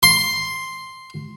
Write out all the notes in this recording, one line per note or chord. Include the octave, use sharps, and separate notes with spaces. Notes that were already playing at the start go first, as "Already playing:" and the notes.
C6